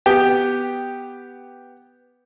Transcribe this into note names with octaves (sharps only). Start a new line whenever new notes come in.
B3 G4